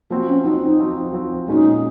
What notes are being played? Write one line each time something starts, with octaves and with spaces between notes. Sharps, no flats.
F3 A#3 C4 F#4
C#4
F3 C4 D#4 F#4
D#4
F3 C4 F#4
F3 C4 F#4
A#2 G#3 C#4 D#4 F#4